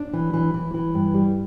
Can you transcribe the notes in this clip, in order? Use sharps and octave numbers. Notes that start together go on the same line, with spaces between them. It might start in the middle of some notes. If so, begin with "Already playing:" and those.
Already playing: D4
E3
E3
E3
E3
G2
G3